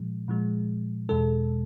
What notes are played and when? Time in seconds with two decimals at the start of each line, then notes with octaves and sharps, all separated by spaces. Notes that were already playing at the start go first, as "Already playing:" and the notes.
Already playing: A#2 F3 G#3
0.28 A#2 F3 G#3
1.09 E2 B2 G#3 A4